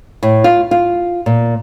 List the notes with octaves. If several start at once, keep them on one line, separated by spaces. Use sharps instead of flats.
A2
F4
F4
A#2